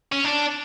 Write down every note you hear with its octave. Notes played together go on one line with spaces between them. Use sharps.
C#4
D4